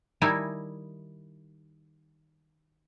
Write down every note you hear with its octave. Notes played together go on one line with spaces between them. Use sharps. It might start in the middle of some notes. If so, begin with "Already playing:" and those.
D#3 G3 D#4 E4 G#5 A5